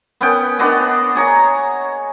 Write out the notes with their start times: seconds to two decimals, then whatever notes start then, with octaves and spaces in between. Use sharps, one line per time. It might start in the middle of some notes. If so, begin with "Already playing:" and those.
0.21 B3 C#4 G5
0.59 B3 D4 F#4 D#5
1.15 G#4 C#5 A#5